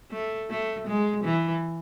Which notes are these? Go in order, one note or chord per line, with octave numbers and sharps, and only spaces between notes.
A3
A3
G#3
E3